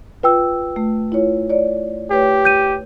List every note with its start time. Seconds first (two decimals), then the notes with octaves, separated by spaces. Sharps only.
0.23 F4 B4 G5 E6
0.76 A3
1.12 E4 F4 C#5
1.50 C#5 D5
2.11 A3 G4 B4 C#5
2.45 G6 D#7